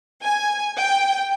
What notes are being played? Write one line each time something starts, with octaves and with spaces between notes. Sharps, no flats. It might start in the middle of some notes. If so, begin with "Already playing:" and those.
G#5
G5